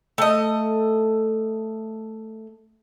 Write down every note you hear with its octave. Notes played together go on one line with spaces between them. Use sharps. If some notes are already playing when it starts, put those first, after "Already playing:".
A3 D#5